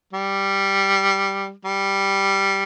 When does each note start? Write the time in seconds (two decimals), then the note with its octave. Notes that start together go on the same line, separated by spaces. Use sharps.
0.13 G3
1.65 G3